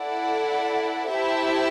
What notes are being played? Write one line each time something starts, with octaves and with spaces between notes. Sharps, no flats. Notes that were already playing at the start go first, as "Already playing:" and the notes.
Already playing: E4 A4 D5 F#5
E4 G4 C5 E5 A5